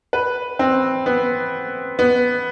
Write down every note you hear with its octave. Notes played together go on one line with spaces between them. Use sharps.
B4
C4
B3
B3